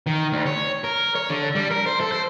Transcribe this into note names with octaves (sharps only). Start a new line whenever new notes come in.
D#3
D2
C#5
A#4
C#5
D3
G3
A#4
C5
A4
C5